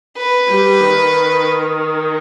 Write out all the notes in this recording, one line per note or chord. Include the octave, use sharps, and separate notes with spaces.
B4
G3
D#3